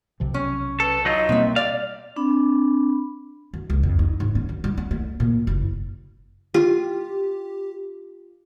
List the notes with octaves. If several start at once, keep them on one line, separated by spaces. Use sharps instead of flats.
B1 C3 F3
C#4
A4 B4
F#3 D#4 F4 D#5
B2 G3 A#3 C4 E5
D5 F5
C4 D4 B5
F#2
C#2
F2
D#4
G#2
C#4
F#2
G3
C#4
A3
A#2
F#1
F4 G4